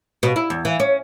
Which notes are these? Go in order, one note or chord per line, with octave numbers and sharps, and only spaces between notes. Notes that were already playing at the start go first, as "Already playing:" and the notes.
B2
E4
E2
E3
C#4